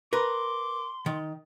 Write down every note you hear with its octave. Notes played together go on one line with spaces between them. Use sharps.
A#4 B4 C6 D6
D#3